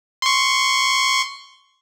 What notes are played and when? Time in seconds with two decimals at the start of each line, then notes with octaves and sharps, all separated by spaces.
0.22 C6 C#6